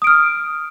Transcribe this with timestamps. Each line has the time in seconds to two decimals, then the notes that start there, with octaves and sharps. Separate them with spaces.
0.02 D#6
0.04 D7
0.07 F6